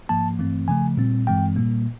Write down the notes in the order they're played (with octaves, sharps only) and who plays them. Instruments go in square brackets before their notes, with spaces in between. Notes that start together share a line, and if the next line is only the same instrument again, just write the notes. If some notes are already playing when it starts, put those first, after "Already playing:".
[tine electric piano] G#2 F3 A#3 A5
G2 E3 A3 C4
C#3 F3 A3 G#5
A#2 G3 C4
G2 E3 G#3 C4 G5
A#2 G3 A#3